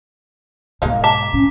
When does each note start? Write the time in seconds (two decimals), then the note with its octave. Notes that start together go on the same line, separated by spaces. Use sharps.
0.82 G#2 B2 G#3 A#3 D#4
1.04 A5 A#5 D6 B6
1.33 A2 C#4